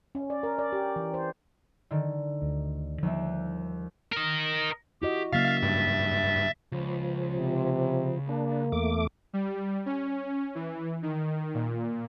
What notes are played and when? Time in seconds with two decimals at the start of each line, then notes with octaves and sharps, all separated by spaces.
0.15 C#4
0.30 D5
0.43 A#4
0.59 D5
0.72 G4
0.96 E3
1.14 C5
1.91 D3 D#3
2.42 D2
3.03 D#2 F3 G3 E5
4.13 A#4 D#5
5.02 E4 F#4 G4 D#5
5.33 C#3 F#3 A#3 E5 F5 A6
5.63 G2
6.72 C#2 F3
7.37 C3
8.29 A#3 D4
8.72 E2 A3 D6
9.33 G3
9.86 C#4
10.55 E3
11.03 D#3
11.54 A#2